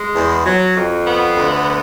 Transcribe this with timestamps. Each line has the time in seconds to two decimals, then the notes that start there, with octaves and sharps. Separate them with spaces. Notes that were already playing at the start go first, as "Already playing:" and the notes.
Already playing: G#3
0.14 E2
0.44 F#3
0.75 F2
1.05 B3
1.36 D2
1.67 B3